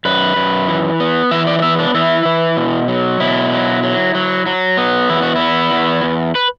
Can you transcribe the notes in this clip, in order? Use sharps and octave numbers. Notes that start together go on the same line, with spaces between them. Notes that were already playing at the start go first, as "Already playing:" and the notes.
F#2 B4
F#2
E3
B3
E3 E5
D5
D5
B3 E5
D4
E3 E4
E3
B2
F#3
B2 E4
F#3
F#3
F#3
F#3
B3
E2 E4
F#4
B3 E4
E2
E2
B4